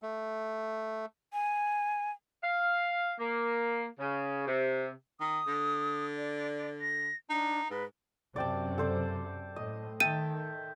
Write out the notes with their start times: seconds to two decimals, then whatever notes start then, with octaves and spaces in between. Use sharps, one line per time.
0.02 A3
1.33 G#5
2.43 F5
3.19 A#3
3.99 C#3
4.47 C3
5.21 D#3 D#6
5.47 D3
6.17 D5
6.81 A#6
7.30 D4 D#4
7.70 G#2 B4
8.36 F#2 C3 D5 G5 A5
8.78 A4 C5 D5
9.56 A2 D#5
10.00 D#3 E5 G5 A5 D#7